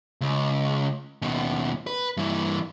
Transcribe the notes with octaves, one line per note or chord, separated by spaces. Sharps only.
C#2
D#2 B2
B4
G2 E3